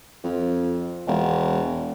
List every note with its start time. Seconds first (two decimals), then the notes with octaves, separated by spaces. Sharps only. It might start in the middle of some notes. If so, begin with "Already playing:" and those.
0.24 F2
1.07 E1